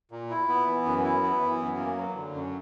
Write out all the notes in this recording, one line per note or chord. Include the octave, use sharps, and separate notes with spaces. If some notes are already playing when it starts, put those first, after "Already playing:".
A#2
E4
B3
E3
F#2
E4
B3
E3
F#2
A#3
F#3
D3
F#2